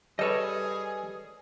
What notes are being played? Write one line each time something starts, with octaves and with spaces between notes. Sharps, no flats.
G3 G#4 A4 B4 C#5 D#5